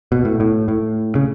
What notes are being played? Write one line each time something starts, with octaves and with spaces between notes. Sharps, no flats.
B2
A2
A2
A2
C#3